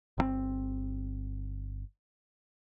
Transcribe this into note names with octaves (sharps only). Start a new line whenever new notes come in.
G1 D3 C4